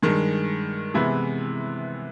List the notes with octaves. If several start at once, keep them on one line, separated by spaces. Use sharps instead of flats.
G2 D#3 G#3
C3 E3 G#3 B3 E4